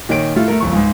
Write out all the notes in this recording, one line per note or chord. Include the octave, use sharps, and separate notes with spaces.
A#2 D#3 C#5 D7
A2 A3 F4
A3 A#4
G1 F2 C#6
C#2 G#2